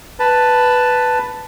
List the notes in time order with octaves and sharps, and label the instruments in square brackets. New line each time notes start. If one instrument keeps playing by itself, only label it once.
[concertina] B4 A5